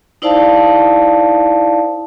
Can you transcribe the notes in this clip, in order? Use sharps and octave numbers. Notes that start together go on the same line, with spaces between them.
D#4 E4 C5 D5 F5 A5